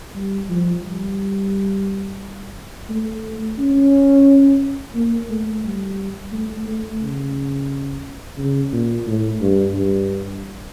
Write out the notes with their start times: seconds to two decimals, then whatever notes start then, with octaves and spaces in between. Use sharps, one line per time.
0.15 G3
0.50 F3
0.84 G3
2.90 A3
3.58 C#4
4.95 A#3
5.30 A3
5.63 G3
6.32 A3
6.66 A3
7.01 C#3
8.38 C#3
8.73 A#2
9.07 A2
9.41 G2
9.75 G2